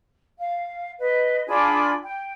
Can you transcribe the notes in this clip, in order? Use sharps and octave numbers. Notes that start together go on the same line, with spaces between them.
F5
B4 D#5
D4 F4 G#4 B5
G5